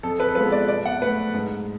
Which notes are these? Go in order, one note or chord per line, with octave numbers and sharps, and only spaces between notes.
F2 A4
B4
A4
F3 G#3 B3 B4
D5
B2 D5
F#5
A3 B4
G#2